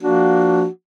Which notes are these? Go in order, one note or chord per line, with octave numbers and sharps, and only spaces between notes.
F3 A#3 D4 F#4